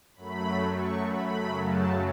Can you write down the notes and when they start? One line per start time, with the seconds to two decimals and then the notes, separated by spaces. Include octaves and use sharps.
0.16 F#2 F#3 A3 B5
0.77 C#6
1.08 B5
1.39 F#2 C#3 F#3 A3
1.69 A5